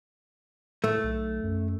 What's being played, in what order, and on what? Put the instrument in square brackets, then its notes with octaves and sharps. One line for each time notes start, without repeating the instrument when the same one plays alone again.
[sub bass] A2 [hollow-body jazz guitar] A3
[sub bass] B1
F#2